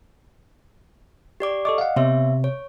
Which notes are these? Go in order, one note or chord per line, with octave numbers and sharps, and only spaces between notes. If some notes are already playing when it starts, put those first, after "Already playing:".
G4 D5 D6
A4 D#5 C#6 D6
F5 F#5
C3 B3 C#5 E5
C#5